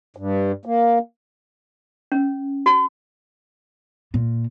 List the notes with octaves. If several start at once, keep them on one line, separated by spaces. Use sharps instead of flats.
G2
A#3
C#4
F#4
A#2